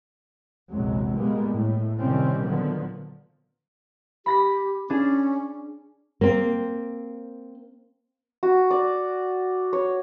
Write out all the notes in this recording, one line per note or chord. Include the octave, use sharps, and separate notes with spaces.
A#1 E2 C3 F#3 G#3
A#2 G3 G#3 A#3 B3
A2
C3 D#3 G3 C4 C#4
A#2 D3 D#3 F3 F#3 B3
G4 B5 A#6 B6
C#4 D4 G#4
A#3 C4
F#4
D5
C#5